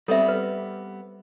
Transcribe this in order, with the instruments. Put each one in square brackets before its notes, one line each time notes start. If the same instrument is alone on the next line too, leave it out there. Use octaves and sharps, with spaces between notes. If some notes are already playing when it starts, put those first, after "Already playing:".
[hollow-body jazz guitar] G3 B3 C4 [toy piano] A4 E5
[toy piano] B4